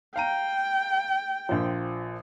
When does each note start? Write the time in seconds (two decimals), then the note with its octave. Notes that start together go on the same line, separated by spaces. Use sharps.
0.16 F5 G5 A#5 D#7
1.49 A#1 F3